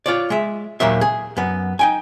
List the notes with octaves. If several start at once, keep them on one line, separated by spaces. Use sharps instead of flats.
F4 C#5 D5
G#3 E5
D#2 A#2 D#3 F#3 A#3 E5
G#4
F#2 B3
D#4 G5 G#5